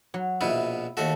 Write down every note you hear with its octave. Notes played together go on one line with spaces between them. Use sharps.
F#3
A#1 B2 B3 E4
D#2 A3 F#4 A4